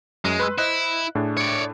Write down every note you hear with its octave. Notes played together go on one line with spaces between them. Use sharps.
F#2 G#3
B4 C6 E6
E4 C5 D#5 F#6
A2 D4 G#4
C#5 D5